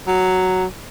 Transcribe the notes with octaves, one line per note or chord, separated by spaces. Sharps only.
F#3